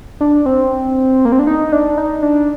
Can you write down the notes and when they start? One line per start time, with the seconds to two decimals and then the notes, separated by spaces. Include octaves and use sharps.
0.21 D4
0.46 C4
1.25 A#3
1.32 C4
1.39 D4
1.47 D#4
1.72 D4
1.98 D#4
2.22 D4